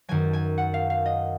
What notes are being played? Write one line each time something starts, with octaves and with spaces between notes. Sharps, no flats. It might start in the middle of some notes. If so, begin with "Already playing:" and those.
F#2 D#3 F#3 G#5
G#5
F#5
F5
F5
D#5